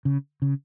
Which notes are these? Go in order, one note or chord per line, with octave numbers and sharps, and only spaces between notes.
C#3
C#3